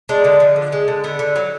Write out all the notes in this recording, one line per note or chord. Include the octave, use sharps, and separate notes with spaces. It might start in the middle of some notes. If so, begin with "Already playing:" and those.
G#3 D4
D3
F3
D3
G#3
D3
D3 B3
D3
F#3